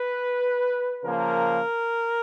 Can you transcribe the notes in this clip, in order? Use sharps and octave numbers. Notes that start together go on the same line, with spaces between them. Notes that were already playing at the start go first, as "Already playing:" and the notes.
Already playing: B4
C#3 F3 A#3 A#4